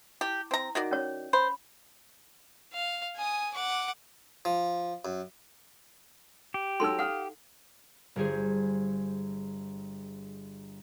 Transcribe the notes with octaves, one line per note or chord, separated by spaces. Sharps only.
E4 G4
C4 A#5
D#3 F#4 D5
C#4 C#5
C5 B5
F5
G#5 D#6
F#5 D6
F3
F#2
G4
F#3 D#4 A4 C6 E6
F5 F#5 D#6 F6
G1 G3 G#4 C5